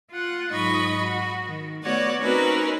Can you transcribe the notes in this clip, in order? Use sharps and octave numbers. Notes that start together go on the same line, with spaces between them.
F4 F#5
G#2 F#3 D#4 D#5 B5 C#6
F#4
D#3
A3 B3 F#4 C#5 D5 F#5
C4 C#4 D#4 F#4 A#4 B4